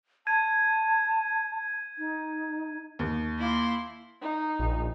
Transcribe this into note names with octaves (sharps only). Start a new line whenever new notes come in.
A5 G#6 D#7
D#4
D#2
A#3 E4 C6
D#4
A#1